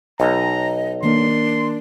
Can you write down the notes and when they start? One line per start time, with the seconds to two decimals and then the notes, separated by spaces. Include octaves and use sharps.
0.20 B1 D#5 A#5
1.03 D#3 A#3 D4 A#4 C6